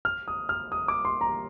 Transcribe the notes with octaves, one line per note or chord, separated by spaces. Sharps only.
F6
D#6
F6
D#6
D6
C6
A#5